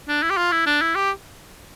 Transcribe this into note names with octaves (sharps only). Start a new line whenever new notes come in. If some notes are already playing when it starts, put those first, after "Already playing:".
D4
E4
G4
F4
E4
D4
E4
G4